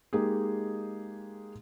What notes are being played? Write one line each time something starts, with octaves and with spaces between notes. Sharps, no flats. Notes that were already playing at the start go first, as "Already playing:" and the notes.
G#3 A#3 D#4 G4 G#4